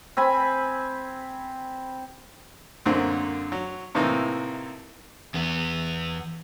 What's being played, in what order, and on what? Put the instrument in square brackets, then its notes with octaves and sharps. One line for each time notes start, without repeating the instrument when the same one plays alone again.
[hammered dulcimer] C4 G#5 B5
[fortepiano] F#2 A#2 D3 C4
F#3
A2 C3 E3 A#3 D#4
[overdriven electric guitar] E2 B3